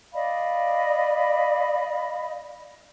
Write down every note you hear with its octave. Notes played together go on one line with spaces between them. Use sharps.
D5 D#5 F5 B5